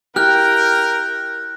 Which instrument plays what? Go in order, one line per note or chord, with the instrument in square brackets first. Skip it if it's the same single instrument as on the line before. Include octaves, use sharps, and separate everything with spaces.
[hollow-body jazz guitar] E4 G4 [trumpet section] A#4 [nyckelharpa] G5 [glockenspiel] F6 F#6